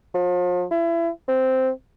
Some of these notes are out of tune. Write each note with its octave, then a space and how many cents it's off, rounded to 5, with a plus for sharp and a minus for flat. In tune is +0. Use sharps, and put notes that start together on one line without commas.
F3 +40
E4 +30
C4 -5